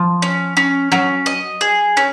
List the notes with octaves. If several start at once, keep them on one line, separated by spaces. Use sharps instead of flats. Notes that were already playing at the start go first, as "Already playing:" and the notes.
Already playing: F3
C#4
C#4
F#3 C#4
D#5
G#4
C#4